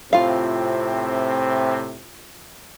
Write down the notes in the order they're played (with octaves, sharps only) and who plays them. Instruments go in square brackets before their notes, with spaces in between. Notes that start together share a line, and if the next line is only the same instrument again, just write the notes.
[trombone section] A2 C3 C4 [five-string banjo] F4 F5